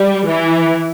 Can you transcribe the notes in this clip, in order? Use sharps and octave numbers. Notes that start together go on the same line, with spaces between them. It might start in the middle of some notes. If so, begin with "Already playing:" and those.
Already playing: G3
E3